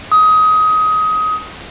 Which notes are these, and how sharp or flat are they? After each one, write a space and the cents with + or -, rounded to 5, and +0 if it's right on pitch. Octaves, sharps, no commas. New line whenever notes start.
D#6 +20